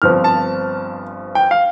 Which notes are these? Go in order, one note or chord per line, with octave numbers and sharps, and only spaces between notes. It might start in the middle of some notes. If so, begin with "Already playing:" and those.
G1 G2 F3 C4 F6
A5
G5
F5